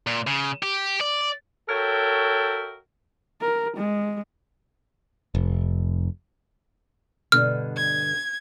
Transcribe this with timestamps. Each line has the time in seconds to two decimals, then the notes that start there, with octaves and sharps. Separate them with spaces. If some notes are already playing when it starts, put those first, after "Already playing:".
0.07 A#2
0.27 C#3
0.63 G4
1.01 D5
1.69 F#4 A4 A#4 C#5 E5 G5
3.41 A#4
3.77 G#3
5.35 F1
7.32 G2 B2 D3 F6
7.77 G#6